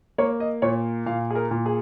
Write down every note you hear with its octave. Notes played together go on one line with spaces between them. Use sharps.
A#3 C#5
D#5
A#2 C#5
A#2 F5
G#4
A#4
A#2
G#4